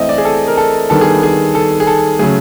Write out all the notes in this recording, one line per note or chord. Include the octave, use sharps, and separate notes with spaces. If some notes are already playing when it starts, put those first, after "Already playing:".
Already playing: E3 A3 C4 D#5 E5
D5
G#4
A4
A#4
A4
D#3 G3 B3 D4 A4
G#4
G#4
A4
G#4
A4
C#3 F#3 A3 G#4